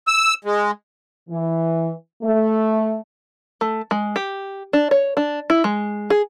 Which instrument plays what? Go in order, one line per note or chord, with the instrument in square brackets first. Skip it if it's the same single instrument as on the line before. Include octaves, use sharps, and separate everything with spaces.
[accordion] E6
G#3
[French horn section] E3
A3
[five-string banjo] A3
G#3
G4
D4
C#5
D4
E4
G#3
G#4